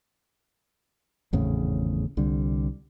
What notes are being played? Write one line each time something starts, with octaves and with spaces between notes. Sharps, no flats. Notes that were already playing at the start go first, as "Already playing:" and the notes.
G#1 E2 A2 C#3
C2 D3 G3